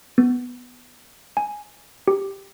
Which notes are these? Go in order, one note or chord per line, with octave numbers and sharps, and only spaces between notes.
B3
G#5
G4